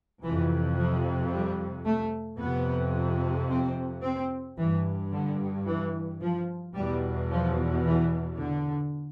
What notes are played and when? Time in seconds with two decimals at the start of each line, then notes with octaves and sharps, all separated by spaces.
0.22 F2 C3 E3
0.77 F3
1.31 G3
1.85 A3
2.39 F2 C3 B3
3.49 C4
4.03 C4
4.57 G2 E3
5.12 D3
5.66 E3
6.20 F3
6.75 E2 B2 G3
7.30 F3
7.84 E3
8.39 D3